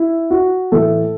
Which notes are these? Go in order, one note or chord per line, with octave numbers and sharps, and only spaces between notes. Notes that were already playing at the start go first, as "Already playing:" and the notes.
Already playing: E4
F#4
A2 E3 A4